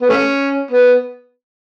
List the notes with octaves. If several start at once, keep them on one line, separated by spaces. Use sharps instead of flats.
B3
A3 C#4
B3